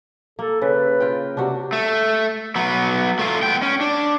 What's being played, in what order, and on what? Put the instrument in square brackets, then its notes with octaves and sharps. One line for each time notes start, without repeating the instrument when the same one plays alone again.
[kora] A#3 [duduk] A4
[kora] C#3 [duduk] B4
[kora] F4 A#4 G5
[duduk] C3 [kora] D4 F#4
[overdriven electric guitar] A3
F#3 B3
A3 F4
B3 G5
C#4
D4